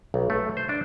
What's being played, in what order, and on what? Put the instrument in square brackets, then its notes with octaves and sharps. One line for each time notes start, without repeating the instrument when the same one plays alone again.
[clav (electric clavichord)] B1
A3
C5
D4